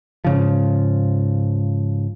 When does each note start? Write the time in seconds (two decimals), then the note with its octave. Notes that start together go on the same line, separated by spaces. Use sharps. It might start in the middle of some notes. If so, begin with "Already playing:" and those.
0.25 G#2 C#3 F3